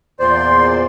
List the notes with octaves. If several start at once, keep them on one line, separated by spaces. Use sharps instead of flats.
E2 A#2 C5 D5 C6